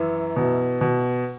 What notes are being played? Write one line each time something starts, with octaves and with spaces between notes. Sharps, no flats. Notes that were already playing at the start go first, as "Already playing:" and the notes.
Already playing: F#2 E3
B2
B2